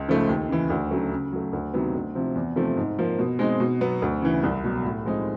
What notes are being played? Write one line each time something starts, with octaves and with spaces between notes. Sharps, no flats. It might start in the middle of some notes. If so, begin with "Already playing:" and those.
Already playing: C#2
C#3 F3 A3
D#2
C#3 E3
D2
C#3 F#3 A3
C#3
F#3 A3
D2
C3 D#3 F#3 B3
D2
C3 F3
E2
C3 F3 A3
G#2
F3 A#3
B2
G#3 C4 D#4
B2
F#3 B3
D2
C#3 E3
C2
B2 F#3
A2
F3 G#3 C4 D#4